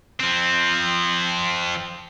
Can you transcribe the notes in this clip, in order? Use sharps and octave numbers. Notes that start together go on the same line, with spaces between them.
F3 C4